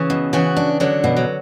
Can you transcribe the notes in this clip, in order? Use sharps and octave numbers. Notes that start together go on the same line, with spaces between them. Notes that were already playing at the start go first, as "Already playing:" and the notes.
Already playing: C#3 E3
B2
C#3 E3 F#4
D4
D3 F#3 D4
B2
F#3